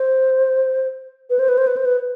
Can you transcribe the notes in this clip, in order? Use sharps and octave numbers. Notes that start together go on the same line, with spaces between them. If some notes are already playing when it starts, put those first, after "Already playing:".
Already playing: C5
B4
C5
B4
C5
B4
C5
B4